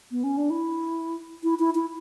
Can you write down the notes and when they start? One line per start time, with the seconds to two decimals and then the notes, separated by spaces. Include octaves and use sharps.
0.11 B3
0.24 C#4
0.38 D4
0.50 E4
1.44 E4
1.59 E4
1.75 E4